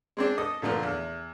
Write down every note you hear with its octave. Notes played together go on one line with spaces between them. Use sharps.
G#3 C4 D4
A4 D#5 D#6
A#2 D3 F3 A3 A#3
E2